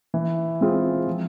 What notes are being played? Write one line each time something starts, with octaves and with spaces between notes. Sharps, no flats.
E3
G#3 C4 F4 G#4
F3